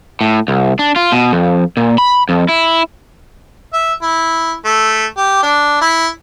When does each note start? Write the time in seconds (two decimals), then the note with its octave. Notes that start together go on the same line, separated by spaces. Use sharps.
0.21 A2
0.48 C2
0.79 D4
0.96 F4
1.12 B2
1.32 F2
1.77 A#2
1.98 B5
2.29 F2
2.49 E4
3.73 E5
4.02 E4
4.65 A3
5.17 G4
5.43 D4
5.81 E4